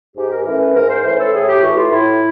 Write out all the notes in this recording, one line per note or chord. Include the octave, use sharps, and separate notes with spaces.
G#2 G4
A#4
E3 A3 C#4 A#4
B4
G#2 A#4
C5
E3 A3 C#4 C5
A4
A2 G#4
G4
E3 A3 F#4
F4
A2 E4